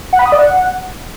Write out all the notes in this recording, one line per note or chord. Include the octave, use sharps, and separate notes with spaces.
F#5
B5
D#6
D5
F#5